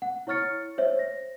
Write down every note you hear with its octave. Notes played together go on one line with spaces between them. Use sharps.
F#5
E4 C#5 C#6 F6 A6 C#7
C5 C#5 E5
A#6